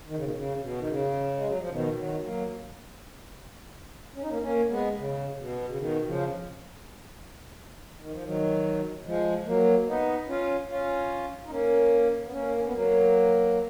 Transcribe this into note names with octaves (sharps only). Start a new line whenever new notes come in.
D#3
C#3
B2 D#3
C#3
B2
D#3
C#3
G#3
F#3
F3
B2 D#3
D#3 F#3
F#3 A#3
C#4
D#4
A#3 C#4
A#3 C#4
G#3 B3
C#3
C#3
B2
C#3
B2 D#3
C#3 F3
D#3
F3
D#3 F#3
F3 G#3
F#3 A#3
B3 D#4
C#4 F4
C#4 F4
D#4
A#3 C#4
B3
A#3 C#4
C#4
B3
F#3 A#3